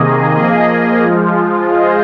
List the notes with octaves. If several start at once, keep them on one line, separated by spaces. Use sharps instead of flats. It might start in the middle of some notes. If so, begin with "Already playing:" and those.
Already playing: C3 D#3 A#3 G#4 D#5
F3 A#3 G#4 D#5
F3 G#3 F4
G#3 F4 G#4 C5 D#5